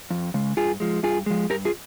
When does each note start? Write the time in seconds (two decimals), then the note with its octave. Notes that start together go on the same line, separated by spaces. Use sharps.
0.11 F2
0.34 C#3 G#3
0.57 G2 F4 G#4
0.80 F3 G#3
1.03 G2 F4 G#4
1.26 F3 G#3
1.50 G2 G4 A#4
1.65 F4 G#4